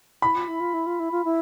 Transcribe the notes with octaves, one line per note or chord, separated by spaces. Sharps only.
E4 B5
F4
E4
F4
E4
F4
E4
F4
E4